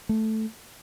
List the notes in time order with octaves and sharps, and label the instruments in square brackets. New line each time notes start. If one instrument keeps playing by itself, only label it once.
[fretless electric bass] A3